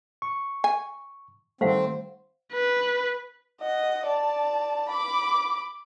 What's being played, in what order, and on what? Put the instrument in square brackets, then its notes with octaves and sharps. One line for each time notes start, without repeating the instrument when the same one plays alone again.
[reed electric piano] C#6
[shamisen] G#5
[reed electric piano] D#3 G3 A3 [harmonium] C4 [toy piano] C5 F5 F#5
[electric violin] B4
[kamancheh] D#5 F#5
D5 A5
B5 D6